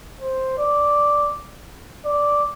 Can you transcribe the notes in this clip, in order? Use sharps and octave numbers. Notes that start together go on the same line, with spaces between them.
C5
D5
D5